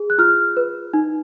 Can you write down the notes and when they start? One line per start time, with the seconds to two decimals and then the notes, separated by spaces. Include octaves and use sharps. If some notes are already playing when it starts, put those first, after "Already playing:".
Already playing: G#4
0.10 F#6
0.18 F4 F6
0.57 B4
0.93 D#4